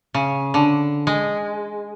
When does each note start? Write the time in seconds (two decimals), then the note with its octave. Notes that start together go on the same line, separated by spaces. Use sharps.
0.14 C#3
0.54 D3
1.07 G#3